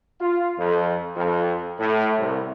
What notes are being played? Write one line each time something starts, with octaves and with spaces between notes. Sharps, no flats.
F4
F2
F2
A2
C2